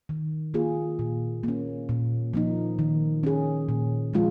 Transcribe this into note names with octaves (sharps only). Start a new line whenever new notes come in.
D#3
A#3 F4 G#4
A#2
A#3 C#4
A#2
F3 A#3 D#4
D#3
C#4 G#4
A#2
F3 G#3 F4